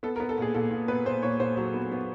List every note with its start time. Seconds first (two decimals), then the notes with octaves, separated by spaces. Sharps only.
0.03 B3 A4
0.16 A#4
0.20 B3
0.29 A4
0.38 A#2 G#4
0.54 A#2 A4
0.71 A#2
0.88 B3 B4
1.06 A#2 C5
1.23 A#2 C#5
1.40 A#2 C5
1.57 F#3
1.74 B3
1.92 B3